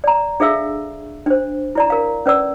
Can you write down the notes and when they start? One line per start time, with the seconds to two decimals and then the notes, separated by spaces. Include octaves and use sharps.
0.04 D5 A#5
0.40 D4 G#4 A4 E5 F5 E6
1.26 D4 C5
1.75 E4 D5 A#5
1.90 A#4 F5
2.26 C#4 B4 D5 E6